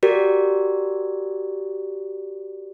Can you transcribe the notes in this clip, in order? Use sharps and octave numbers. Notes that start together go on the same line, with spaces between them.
F#4 G4 A#4 D5